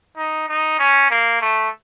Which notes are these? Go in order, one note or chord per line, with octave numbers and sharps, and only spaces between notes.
D#4
D#4
C#4
A#3
A3